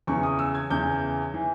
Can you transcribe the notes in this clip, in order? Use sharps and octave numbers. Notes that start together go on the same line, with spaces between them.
E2 C#3 E3 C#6
D#6
E6
G#6
E2 C#3 E3 G6
E3